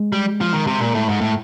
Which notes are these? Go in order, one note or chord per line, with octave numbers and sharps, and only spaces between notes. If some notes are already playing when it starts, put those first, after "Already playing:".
Already playing: G#3
G3
F3
D#3
C3
A#2
A2
G#2
A2